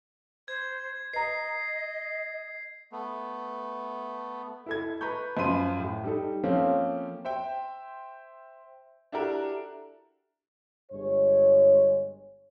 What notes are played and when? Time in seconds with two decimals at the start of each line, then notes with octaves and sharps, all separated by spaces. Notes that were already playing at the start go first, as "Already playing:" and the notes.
0.48 C5 G#6
1.13 B4 D#5 A#5 C7
2.92 A3 B3
4.66 E4 A4 G#6
5.01 B4 A#5 B5 C#6 G6
5.37 F#2 F3 C5 B5 C6 D#7
5.80 A2
6.04 G3 D#4 A4
6.44 F3 A3 A#3 C4 C#4
7.25 C5 E5 G5
9.12 D4 E4 F#4 G4 A4 A#4
10.92 G1 G2 G#3 C#5